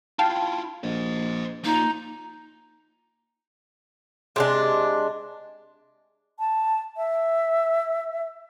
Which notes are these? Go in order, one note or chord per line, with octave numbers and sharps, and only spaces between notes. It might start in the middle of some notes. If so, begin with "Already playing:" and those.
E4 F4 F5 G5 A5
A#1 C5 D#5
A#3 D#4 F4
C3 G#3 D4
A5
E5